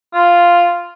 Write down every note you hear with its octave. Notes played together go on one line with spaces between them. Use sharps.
F4